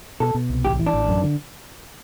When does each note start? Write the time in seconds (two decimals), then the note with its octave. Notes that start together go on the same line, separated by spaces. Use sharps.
0.20 B2 A4
0.35 B2
0.50 C2
0.65 A1 G4
0.79 E3
0.86 D4
0.94 A1
1.09 F#2
1.24 D3